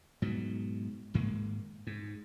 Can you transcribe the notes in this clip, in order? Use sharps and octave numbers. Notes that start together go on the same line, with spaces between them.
G#2 B2 F#3
G#1 G#2 G#3 A#3
G#2